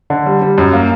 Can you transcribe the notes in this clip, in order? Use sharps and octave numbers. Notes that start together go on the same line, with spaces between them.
D3
G3
G3
F#2
A#3